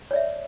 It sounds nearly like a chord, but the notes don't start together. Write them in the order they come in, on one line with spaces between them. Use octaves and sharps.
C#5 D5 E5